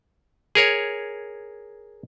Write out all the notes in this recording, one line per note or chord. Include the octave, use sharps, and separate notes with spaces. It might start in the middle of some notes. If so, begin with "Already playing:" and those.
G#4 A#4 C#5